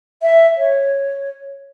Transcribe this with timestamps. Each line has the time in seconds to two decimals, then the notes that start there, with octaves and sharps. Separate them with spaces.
0.22 E5
0.57 C#5